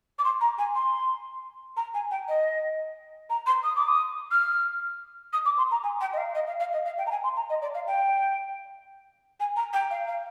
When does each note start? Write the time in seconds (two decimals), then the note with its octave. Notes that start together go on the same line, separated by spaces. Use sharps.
0.18 D6
0.24 C6
0.41 A#5
0.58 G#5
0.75 C6
1.76 A#5
1.94 G#5
2.11 G5
2.28 D#5
3.29 A#5
3.46 C6
3.63 D#6
3.76 D6
3.88 D#6
4.31 F6
5.33 D#6
5.45 D6
5.58 C6
5.71 A#5
5.83 G#5
6.01 G5
6.13 D#5
6.17 F5
6.35 D#5
6.47 F5
6.60 F5
6.72 D#5
6.85 F5
6.98 G5
7.06 A#5
7.11 G#5
7.23 C6
7.36 A#5
7.49 D#5
7.61 D5
7.74 F5
7.87 G5
9.40 G#5
9.56 A#5
9.73 G5
9.90 F5
10.07 F5